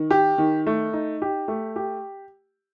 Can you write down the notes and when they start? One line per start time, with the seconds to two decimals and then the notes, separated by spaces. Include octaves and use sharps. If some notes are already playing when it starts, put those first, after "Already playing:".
Already playing: D#3
0.11 G4
0.38 D#3
0.67 A3
0.93 D#4
1.22 G4
1.48 A3
1.76 G4